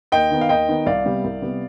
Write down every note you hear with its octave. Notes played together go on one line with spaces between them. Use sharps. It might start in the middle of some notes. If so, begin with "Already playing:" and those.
D#2 D#5 G5
D#3 B3
F5
D#2 D#5 G5
D#3 B3
C2 D5 F5
C3 G3 B3
C2
C3 G3 B3